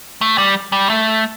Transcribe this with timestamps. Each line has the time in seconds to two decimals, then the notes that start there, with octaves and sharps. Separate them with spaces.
0.21 A3
0.38 G3
0.72 G3
0.90 A3